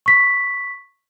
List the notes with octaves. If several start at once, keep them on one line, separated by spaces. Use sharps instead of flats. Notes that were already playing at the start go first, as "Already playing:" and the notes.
C#6 B6